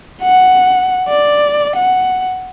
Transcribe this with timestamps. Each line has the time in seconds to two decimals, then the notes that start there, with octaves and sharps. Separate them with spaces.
0.22 F#5
1.08 D5
1.76 F#5